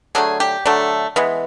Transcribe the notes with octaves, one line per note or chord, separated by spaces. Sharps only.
D3 F#3 A3 G#4
G4
D3 F#3 A3
E3 G#3 B3